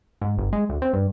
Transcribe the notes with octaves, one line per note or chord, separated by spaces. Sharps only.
G#2
G1
G#3
D2
C4
G2